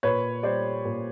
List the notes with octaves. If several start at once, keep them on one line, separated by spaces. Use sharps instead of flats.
A#2 B4 C#5
G3 C5 D5
A#2